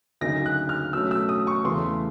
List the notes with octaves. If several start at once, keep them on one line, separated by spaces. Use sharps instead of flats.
D2 C#3 F#3 A#3 D#4 A#6
F#6
F6
B2 F#3 A3 C#4 E6
E6
D#6
C#6
E2 C#3 E3 A3 C6